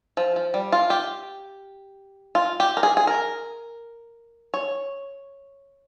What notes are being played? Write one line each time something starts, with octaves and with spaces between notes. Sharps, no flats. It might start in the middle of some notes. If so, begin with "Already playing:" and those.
F3
F3
G3
F4
G4
F4
G4
A#4
G#4
G#4
A#4
C#5